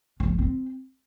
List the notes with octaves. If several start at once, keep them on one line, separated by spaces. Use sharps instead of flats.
F3
A3
C4